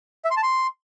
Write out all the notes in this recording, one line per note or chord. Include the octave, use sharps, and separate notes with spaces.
E5
C6
A5
C6